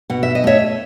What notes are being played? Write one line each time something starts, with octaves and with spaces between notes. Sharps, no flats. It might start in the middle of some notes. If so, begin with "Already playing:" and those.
B2 F#5
E5
D#5
A3 C#5 E5